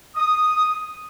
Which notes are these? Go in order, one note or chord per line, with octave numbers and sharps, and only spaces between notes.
D#6